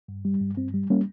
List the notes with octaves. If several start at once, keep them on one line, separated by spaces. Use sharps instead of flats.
G2
G3
G2
G2 C4
G3
G3 A#3 C#4